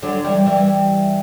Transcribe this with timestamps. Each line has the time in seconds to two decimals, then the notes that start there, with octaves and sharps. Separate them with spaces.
0.02 D3 F#3
0.24 E3 G3
0.46 E3 G3